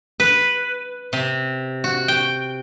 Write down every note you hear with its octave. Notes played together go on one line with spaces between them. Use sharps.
B4
C3
F#4
G5